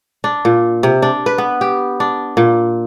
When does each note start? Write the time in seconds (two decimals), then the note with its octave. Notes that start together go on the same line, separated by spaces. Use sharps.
0.24 D4
0.45 A#2
0.83 C3
1.02 D4
1.26 B4
1.38 B3
1.61 G4
2.00 D4
2.37 A#2